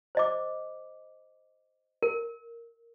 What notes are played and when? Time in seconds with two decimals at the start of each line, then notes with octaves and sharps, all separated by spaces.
0.15 C5 D#5 D6
2.03 A#4